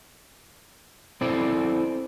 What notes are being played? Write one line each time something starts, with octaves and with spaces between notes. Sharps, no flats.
C4 E4 A4 C5 D5